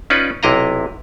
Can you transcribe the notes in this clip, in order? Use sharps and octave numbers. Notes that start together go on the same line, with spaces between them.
C#4 D#4 F4 B4 D5
B1 C3 E4 D#5 F5 A#5